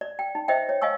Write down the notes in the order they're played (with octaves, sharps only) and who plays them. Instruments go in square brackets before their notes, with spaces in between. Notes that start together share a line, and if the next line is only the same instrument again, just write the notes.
[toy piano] D5
G5
D#4
C5 D#5 E5 G5
C#5
D#5 F5 G#5 C#6 E6